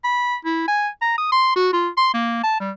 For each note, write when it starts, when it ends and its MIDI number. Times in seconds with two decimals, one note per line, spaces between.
0.04 0.36 83
0.45 0.68 64
0.68 0.89 80
1.02 1.15 82
1.18 1.31 87
1.32 1.52 84
1.56 1.72 66
1.73 1.89 65
1.97 2.09 84
2.14 2.39 58
2.44 2.59 81
2.60 2.71 55